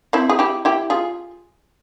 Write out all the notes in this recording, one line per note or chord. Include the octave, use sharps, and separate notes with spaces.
C4 E4
G#4
E4 G4
E4 G4
F4 G#4